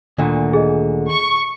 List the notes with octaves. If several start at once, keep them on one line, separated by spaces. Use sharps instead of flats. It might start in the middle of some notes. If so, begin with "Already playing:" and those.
D2 A#2 D3 D#3
G#4 D#5
C#6